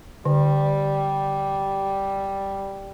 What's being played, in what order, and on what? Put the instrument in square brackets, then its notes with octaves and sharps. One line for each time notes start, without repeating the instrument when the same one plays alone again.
[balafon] D3 [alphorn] G3